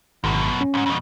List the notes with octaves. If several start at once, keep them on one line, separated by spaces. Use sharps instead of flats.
G#1 F#2 B2
C#4
C#2 G#2
F2 B2